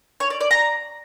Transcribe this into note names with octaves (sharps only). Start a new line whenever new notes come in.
C#5
D5
D5
A#5